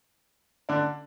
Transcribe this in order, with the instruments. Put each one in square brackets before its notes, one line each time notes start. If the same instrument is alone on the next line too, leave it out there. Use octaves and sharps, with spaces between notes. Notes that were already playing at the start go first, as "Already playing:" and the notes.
[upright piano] D3 D4